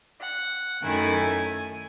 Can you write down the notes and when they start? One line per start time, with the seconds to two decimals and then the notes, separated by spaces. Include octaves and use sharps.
0.20 F#5
0.82 F#2 D#3 A3 E4 G#5